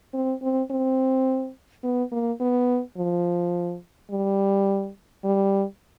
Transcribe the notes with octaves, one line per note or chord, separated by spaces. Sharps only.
C4
C4
C4
B3
A#3
B3
F3
G3
G3